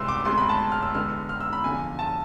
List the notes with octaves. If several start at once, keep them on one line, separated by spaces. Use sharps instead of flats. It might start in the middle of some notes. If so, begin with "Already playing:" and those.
Already playing: C2 C3 G#3 B3 C6 E6
D6
E1 D2 C3 G#3 C6
B5
A5
F6
E6
E2 D3 G#3 B3 F6
F6
E6
B5
F1 E2 D3 F3 G#5
A5